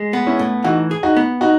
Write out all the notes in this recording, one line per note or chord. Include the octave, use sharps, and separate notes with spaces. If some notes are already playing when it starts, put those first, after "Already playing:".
Already playing: G#3
B3
C#4 E4
A2
E3 D#4 F#4
G#4
D#4 F#4
B3
D#4 F#4